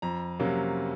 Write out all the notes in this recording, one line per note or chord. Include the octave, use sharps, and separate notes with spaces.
F2 A#5
C3 F#3 A#3 C#4